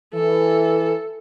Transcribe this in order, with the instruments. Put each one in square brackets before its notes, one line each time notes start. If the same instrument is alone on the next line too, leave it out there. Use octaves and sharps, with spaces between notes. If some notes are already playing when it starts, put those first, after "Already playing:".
[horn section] E3 [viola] A4